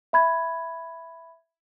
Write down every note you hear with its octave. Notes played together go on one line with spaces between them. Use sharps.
E5 B5 G#6